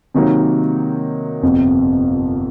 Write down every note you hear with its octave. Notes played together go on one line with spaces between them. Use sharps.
C3 D#3 F#3 A#3 D#4
G1 F2 C3